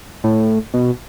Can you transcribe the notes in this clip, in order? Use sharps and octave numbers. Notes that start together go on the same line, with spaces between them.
A2
B2